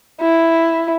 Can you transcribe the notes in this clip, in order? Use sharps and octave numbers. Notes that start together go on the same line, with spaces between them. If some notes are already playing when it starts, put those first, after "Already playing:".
E4